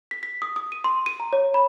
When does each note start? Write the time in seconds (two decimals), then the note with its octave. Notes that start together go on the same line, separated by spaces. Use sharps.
0.11 B6
0.23 B6
0.42 D#6
0.56 D#6
0.72 D#7
0.84 C6
1.06 D#7
1.20 A#5
1.33 C#5
1.54 B5